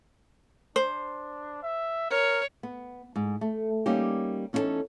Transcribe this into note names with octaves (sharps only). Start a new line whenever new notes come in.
D4 C5
E5
A#4 C#5
B3
G#2
A3
G3 A#3 C#4 D#4 G4
E2 C#4 D#4 E4 A4 A5